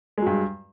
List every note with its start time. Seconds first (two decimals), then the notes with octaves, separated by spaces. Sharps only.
0.18 G#3
0.22 F#3
0.26 G2